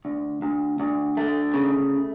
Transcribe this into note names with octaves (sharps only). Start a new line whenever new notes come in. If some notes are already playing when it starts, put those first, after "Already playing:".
D2
D2
D2
A3
C#3